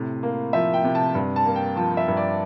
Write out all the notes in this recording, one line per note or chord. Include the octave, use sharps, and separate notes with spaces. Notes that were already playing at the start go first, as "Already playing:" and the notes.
Already playing: A2 C3
A#3
F3 E5
G5
C3
A5
G2
A5
A#3
G5
F3 A5
E5
G2
D5